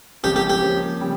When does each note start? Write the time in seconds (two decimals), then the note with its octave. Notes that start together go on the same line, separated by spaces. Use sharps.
0.23 C#3 F3 G#3 C4 G4
0.36 G4
0.50 G4
0.62 F3 A#3 C#4
1.00 C#3 G3 C4